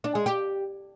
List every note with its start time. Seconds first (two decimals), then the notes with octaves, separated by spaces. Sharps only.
0.04 D4
0.15 G#3
0.26 G4